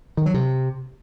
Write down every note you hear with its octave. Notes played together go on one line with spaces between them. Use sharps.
D#3
F#3
C3